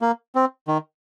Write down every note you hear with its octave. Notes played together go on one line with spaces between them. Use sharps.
A#3
C4
D#3